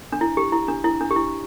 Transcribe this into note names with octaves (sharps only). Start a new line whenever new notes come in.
D4
E4
G4
E4
D4
E4
D4
G4
E4